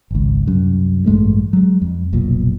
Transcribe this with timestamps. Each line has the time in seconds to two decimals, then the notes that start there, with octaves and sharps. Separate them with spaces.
0.11 G#1 C#2
0.46 C2 F#2
1.06 A1 G2 G#3 A3
1.53 F#3 G#3
1.82 F2
2.13 F1 B1 A#2